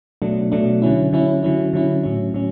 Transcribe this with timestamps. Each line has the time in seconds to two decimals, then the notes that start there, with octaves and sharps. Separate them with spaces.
0.22 B2 F#3 A3 D4
0.52 B2 F#3 A3 D4
0.82 D3 F#3 C#4 E4
1.13 D3 F#3 C#4 E4
1.43 D3 F#3 C#4 E4
1.73 D3 F#3 C#4 E4
2.04 A2 F#3 C#4
2.34 A2 F#3 C#4